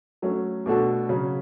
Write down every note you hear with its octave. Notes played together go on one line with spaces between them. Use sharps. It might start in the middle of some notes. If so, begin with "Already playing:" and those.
F#3 A3 C#4
B2 A3 D4 F#4 A4
C#3 F#3 C#4